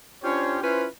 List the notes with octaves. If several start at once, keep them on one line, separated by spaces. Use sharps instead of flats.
C#4 D4 F4 G4 C5 C#5
C#4 E4 F4 B4 C5